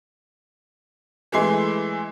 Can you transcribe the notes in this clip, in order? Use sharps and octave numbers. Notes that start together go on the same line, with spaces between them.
E3 G#3 A3 E4 C6 C7